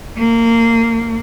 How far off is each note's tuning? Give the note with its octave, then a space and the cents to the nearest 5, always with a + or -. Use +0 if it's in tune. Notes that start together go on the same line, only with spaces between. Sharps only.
A#3 -25